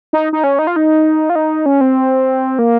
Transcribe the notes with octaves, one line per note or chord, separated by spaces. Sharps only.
D#4
D#4
C#4
D#4
F4
D#4
F4
D#4
C#4
C4
A#3